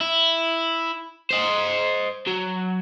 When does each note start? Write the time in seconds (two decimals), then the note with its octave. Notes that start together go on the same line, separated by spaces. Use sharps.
0.01 E4
1.31 C5 D#5
2.27 F#3